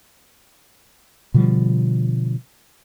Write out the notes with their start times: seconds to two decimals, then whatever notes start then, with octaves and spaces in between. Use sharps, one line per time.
1.34 B2 D3 F3 G3